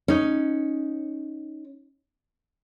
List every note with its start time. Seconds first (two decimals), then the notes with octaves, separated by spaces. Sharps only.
0.08 C#4 D#4